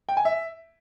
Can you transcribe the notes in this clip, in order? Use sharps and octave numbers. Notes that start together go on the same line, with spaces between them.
G5
G#5
E5